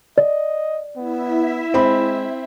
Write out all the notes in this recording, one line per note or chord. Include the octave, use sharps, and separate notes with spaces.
D5 D#5
B3 E4 E5
G#3 C4 B5